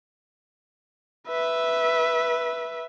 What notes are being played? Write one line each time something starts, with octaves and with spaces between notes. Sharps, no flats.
B4 E5